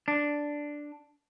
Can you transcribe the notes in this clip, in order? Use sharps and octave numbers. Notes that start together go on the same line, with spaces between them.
D4